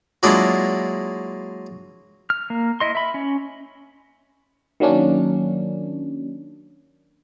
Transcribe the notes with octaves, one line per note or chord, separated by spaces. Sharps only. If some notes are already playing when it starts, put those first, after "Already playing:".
F#3 G#3 A#3 D4 E4 F4
F6
A#3
E4 D#5 C6
E5 B5
C#4
D#3 F#3 A#3 C#4 D4